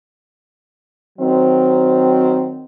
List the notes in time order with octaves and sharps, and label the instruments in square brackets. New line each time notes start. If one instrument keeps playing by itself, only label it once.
[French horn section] D#3 F#3 C4